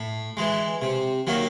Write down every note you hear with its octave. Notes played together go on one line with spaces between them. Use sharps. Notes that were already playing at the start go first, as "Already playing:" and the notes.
Already playing: A2
E3 G#3
C3
D#3 F#3 A#3